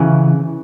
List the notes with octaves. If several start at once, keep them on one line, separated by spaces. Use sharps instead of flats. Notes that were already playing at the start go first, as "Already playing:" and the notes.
Already playing: C#3 E3